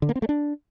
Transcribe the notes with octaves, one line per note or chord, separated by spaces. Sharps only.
D3
A#3
C4
A3
D4